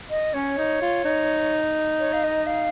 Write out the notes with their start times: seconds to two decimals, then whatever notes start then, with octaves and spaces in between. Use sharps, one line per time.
0.10 D#5
0.34 C#4 C#5
0.58 D#4
0.82 F4
1.05 D#4
2.00 C#5
2.13 F5
2.24 D#5
2.47 F5